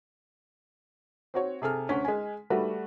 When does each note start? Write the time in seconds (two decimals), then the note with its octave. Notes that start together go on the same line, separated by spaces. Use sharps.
1.34 C4 F#4 C#5
1.62 C3 G#4 A4 F6
1.89 D2 C#4 G#5 B6
2.05 G#3 G#5
2.50 G3 A3 F#4 B4